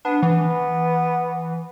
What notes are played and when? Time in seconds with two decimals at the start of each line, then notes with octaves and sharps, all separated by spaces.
0.05 B3 D4
0.23 E3 B3